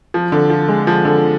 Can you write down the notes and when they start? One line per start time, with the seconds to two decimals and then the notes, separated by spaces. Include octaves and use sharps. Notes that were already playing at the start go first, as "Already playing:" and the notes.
0.14 F3
0.32 D3
0.50 F3
0.68 G#3
0.87 F3
1.05 D3